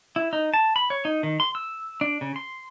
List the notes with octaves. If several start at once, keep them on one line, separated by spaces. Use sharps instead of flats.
E4
D#4
A5
B5
C#5
D#4
D#3
C6
E6
D4
C#3
C6